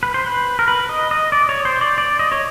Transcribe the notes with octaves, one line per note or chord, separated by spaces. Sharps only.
B4
C5
B4
A#4
B4
D#5
D#5
D5
C#5
C5
D5
D5
D#5
C#5